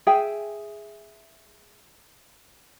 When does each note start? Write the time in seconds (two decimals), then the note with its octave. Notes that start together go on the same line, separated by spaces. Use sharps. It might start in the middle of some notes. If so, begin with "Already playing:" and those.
0.07 G#4 E5 G5 G#5